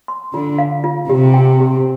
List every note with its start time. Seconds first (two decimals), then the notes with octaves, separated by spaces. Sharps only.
0.08 C6
0.33 D3 F4
0.58 F5
0.84 F4
1.09 C3 G4
1.34 G5
1.60 G4